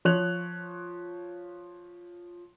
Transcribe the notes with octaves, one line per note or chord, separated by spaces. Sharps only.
F3 C#5 F#6 F7